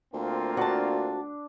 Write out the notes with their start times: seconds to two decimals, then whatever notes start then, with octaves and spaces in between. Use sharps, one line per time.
0.13 D2 A#3 C4 F4
0.57 D4 F#4 A5